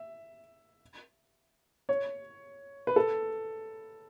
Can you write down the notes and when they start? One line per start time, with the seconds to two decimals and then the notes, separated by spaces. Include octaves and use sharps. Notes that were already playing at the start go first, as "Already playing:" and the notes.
Already playing: E5
1.89 C#5
2.87 B4
2.96 A4